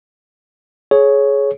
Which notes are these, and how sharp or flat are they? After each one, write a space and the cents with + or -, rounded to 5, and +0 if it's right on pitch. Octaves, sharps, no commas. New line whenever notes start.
G#4 +20 C#5 +0